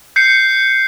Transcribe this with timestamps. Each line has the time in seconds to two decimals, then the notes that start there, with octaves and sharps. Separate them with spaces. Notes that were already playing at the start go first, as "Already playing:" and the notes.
0.16 G6 C7 C#7